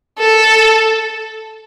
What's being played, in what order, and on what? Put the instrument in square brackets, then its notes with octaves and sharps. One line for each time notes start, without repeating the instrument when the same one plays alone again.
[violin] A4